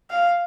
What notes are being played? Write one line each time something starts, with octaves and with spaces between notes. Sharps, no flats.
F5